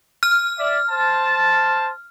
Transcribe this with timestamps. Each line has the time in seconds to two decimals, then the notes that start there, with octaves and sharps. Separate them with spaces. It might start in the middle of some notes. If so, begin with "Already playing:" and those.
0.23 F6
0.59 D5 E5
0.90 C5 A5